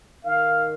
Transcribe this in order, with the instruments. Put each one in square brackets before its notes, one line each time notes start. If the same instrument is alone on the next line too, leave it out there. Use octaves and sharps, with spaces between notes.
[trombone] D#3 [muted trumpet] F5